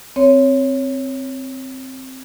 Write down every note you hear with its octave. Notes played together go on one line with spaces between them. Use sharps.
C4 C#5